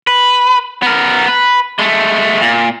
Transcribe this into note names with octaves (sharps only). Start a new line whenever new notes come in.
B4
B3 A#4
B4
G#3 A3
A#2